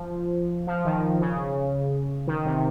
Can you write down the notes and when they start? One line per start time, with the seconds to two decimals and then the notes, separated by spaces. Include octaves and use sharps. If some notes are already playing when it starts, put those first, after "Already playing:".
Already playing: F3
0.67 F3
0.85 D#3
1.20 C#3
2.27 D#3
2.45 C3